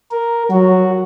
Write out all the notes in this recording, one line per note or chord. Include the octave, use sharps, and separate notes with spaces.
A#4
F#3 F#4